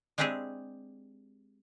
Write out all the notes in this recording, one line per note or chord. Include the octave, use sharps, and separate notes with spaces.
G#3 C4 D4 E4 G4 G#4